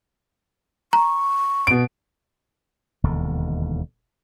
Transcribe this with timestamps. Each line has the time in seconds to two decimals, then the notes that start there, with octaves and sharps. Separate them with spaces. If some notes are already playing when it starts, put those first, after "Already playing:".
0.93 A#5 C#6
1.67 B2 D7
3.04 E1 D#2 D3